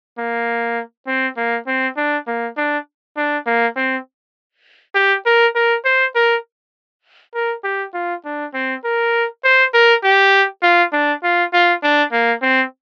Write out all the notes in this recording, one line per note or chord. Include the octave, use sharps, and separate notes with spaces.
A#3
C4
A#3
C4
D4
A#3
D4
D4
A#3
C4
G4
A#4
A#4
C5
A#4
A#4
G4
F4
D4
C4
A#4
C5
A#4
G4
F4
D4
F4
F4
D4
A#3
C4